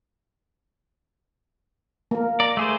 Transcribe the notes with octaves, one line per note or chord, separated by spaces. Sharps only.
A#3 A#4
D5 A#5
A3 G#4 C5